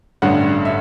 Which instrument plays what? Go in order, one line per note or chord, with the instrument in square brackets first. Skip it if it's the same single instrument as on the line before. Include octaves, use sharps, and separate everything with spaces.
[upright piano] A1 G2 D3 F#5
E5